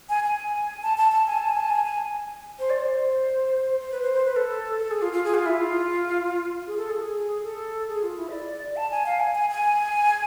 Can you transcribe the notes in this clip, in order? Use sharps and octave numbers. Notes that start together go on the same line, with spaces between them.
G#5
G#5
A5
A5
A5
G#5
A5
G#5
A5
G#5
G#5
C5
D5
C5
C5
B4
C5
C5
B4
A4
A4
G#4
F4
F4
G#4
F4
E4
F4
G#4
A4
G#4
G#4
A4
G#4
F4
E4
E5
D5
D5
A5
G#5
F5
G#5
G#5
G#5